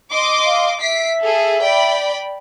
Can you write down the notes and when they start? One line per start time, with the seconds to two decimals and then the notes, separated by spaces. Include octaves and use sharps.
0.12 D#5 C6 D6
0.45 F5
0.82 E5 B6 C7 D7
1.22 G#4 A4
1.62 D5 G5 B5